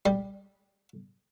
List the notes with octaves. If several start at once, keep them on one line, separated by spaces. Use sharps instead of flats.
G3